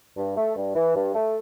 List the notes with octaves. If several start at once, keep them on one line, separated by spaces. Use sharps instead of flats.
G2
A3
G2
E3
G2
A3